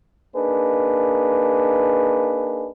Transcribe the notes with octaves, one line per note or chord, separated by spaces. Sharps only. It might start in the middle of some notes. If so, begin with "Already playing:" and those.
A#3 D4 D#4 G#4 B4